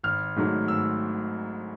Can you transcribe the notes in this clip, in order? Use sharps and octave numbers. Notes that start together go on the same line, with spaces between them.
G#1 F6
G#2 D#3 F#3 A3
G#1 E6